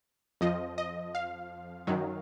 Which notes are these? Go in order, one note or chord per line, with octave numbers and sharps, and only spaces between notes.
F2 F3 D#5
D#5
F5
F#2 D#3 F#3